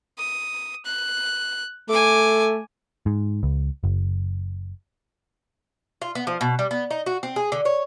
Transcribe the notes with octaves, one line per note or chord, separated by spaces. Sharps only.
D#6
F#6
A3 G#5 D6
G#2
C#2
F#1
F4
B3
F3
B2
G3
B3
D#4
F#4
C4
G#4
D3
C#5